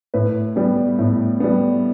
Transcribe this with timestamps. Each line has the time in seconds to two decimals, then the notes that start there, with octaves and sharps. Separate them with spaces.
0.14 A2 B4
0.56 G3 B3
0.99 A2
1.40 G3 B3